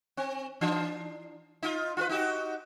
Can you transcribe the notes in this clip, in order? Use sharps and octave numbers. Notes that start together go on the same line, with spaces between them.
C4
E3 D4
D#4 F4
F4 F#4 B4
D#4 F#4 G4